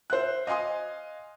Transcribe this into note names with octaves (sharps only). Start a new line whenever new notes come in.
C5 E5 F#6
D#5 F5 G#5 C6 D#6